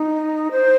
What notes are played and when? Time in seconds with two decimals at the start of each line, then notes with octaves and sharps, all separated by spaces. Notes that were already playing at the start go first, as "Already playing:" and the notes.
Already playing: D#4
0.51 C5